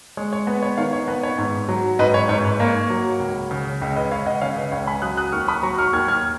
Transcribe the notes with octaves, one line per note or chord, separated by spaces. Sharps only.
G#3 C#5
C#5
B3 B4
C#5
D#3 C#5 F5
C#5
B3 B4
C#5
G#2
F#3
G#2 B4 D#5
C#5
G#2 C#5
B4
A#3 C#5
F#3
C#2
C#3
C#2 C#5
B4 D#5
C#2 C#5 F5
D#5 F#5
C#3 C#5 F5
B4 D#5
C#2 C#5 F5
G#5 B5
F#3 D#6 F#6
D#6 F#6
D#2 C#6 F6
B5 D#6
F#3 A#5 C#6
C#6 F6
D#2 F6 G#6
F6 G#6